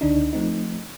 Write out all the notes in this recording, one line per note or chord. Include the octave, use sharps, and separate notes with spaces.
C#2 D3 D4 D#4
F3 A3 C4 D#4